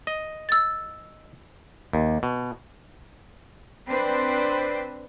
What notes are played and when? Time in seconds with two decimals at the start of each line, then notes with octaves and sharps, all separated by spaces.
0.07 D#5
0.49 E6 A6
1.93 D#2
2.23 B2
3.89 C4 D4 B4 C5